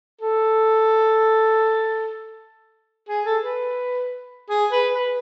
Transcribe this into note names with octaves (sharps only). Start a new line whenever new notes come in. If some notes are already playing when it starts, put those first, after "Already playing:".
A4
G#4
A4
B4
G#4
B4
B4